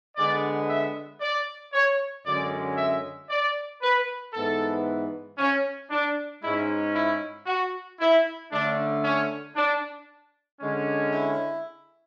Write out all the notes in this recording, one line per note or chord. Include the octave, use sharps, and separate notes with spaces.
D3 G#3 B3 D5
E5
D5
C#5
F#2 D3 G#3 C#4 D5
E5
D5
B4
G#2 E3 B3 A4
C#4
D4
G#2 G#3 C#4 E4
E4
F#4
E4
D3 A3 C#4 D4
C#4
D4
D3 G#3 C#4
E4